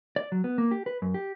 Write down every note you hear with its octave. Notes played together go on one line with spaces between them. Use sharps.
D5
F#3
B3
A#3
G4
B4
F#2
G4